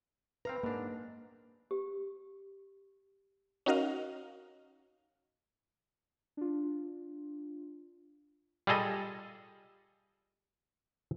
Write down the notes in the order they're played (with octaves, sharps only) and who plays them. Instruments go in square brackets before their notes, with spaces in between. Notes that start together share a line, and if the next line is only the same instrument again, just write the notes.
[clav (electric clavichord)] C4 F5 A#5 [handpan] B4
[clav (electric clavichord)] G#2 D4 [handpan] A#3
[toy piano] G4
[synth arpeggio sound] C#4 D#4 F#4 A#4 D#5 F5
[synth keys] D4 F4
[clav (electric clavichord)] G3 F4 G#4 A4 D#5